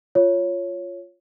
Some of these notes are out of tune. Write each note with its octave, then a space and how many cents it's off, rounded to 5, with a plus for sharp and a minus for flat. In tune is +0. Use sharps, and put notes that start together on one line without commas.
F4 +0 C#5 +0